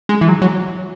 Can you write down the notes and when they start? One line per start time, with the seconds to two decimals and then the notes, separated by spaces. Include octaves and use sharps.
0.09 G#3
0.21 E3
0.29 F#3
0.42 F#3